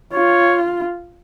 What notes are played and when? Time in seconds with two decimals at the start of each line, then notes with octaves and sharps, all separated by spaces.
0.13 F4 C#5